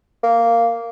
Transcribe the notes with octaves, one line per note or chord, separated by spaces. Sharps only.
A#3